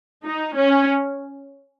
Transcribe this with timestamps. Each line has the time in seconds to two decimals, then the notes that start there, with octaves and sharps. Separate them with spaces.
0.25 D#4
0.54 C#4